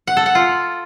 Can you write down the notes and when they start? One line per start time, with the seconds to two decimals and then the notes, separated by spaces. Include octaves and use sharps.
0.07 F#5
0.17 A4
0.26 F#5
0.35 F4